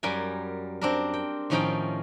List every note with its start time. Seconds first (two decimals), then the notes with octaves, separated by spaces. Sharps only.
0.03 F#2 G3 A#4 G5 G#5
0.81 C4 D4 A#4
1.14 G5
1.50 A2 D#3 F3 C#4 D#4 G5